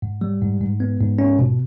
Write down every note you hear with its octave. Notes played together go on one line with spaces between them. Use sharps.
G#2
G3
G#2
G#2
B3
G#2
C#4
B2